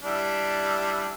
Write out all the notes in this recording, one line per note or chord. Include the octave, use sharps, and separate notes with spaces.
G3 D4 E4